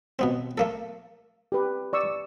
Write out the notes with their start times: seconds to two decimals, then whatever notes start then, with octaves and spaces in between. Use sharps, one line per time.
0.19 B2 B3 C4
0.58 A3 A#3 A4
1.52 G4 B4
1.93 D5 C#6 E6